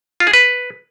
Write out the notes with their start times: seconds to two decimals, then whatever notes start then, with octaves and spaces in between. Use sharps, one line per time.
0.20 F4
0.27 G#4
0.33 B4